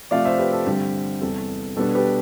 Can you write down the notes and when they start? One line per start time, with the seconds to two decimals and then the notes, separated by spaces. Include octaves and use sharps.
0.11 C3 F3 A3 D5 F5
0.25 C5 E5
0.38 G4 B4
0.52 A4
0.66 G2 D3 G3 C4 G4
1.21 E2 C3 G3 A4
1.76 B2 G3 B3 D4 A4
1.95 G4 B4